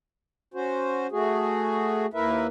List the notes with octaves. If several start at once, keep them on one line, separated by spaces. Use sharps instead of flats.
C#4 F#4 C5
A3 F#4 G#4
D#2 A#3 E4 A#4 B4 E5